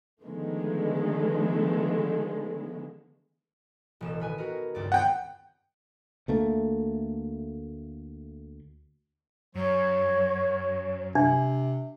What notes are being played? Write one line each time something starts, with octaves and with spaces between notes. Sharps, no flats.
D3 D#3 F3 G#3 A3 B3
E1 A1 E7
D#3 B4 G#5
F#4 A#4
C#2 G2 D5
B3 C4 C5 F#5 G5
D2 A3 A#3
F#2 F#3 C#5
C3 D4